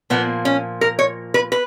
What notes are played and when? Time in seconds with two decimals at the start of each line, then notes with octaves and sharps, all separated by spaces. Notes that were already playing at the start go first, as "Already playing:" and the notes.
0.10 A#2 F3 A#3 B3
0.45 C#4
0.81 A#4
0.99 C#5
1.34 B4
1.52 B4